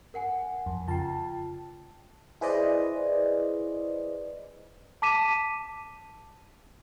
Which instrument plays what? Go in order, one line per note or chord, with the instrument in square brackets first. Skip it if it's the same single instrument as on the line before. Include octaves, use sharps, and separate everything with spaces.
[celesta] A#4 F#5 G#5
[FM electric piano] F2
[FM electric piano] C#3 A5 [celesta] F4 G5
[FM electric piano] E4 G#4 B4 C5 D5 D#5
[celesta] A5 D6 B6 D#7 E7